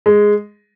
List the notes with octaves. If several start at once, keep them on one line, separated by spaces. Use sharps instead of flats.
G#3